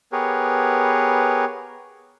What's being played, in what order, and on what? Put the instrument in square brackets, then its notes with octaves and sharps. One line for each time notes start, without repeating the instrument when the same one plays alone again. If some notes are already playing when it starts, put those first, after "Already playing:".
[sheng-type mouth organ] B3 G4 G#4 A#4 B4 C#5